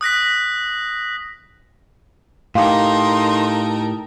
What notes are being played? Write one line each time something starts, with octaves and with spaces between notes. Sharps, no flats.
D#6 F#6 A#6 B6
A2 D#4 G4 A4 A#4 F5 C6